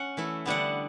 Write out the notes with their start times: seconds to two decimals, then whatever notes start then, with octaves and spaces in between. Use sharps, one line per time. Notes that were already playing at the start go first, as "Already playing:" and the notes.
Already playing: C#4 F#5
0.17 E3 A3 E4
0.46 D3 G3 B3 D4 F#5